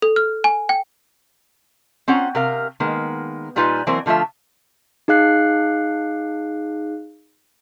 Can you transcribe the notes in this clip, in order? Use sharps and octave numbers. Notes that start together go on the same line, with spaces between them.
A4
F6
G#5
G5
C4 C#4 F4 F#5 A#5
C3 A#4 F5
D#3 G#3 A#3 B3
A#2 G3 D#4 F4 B4 G#5
E3 F#3 A#3 C4 A#4 C5
D3 F3 A3 F4 E5
D#4 G#4 F5 F#6 C7 C#7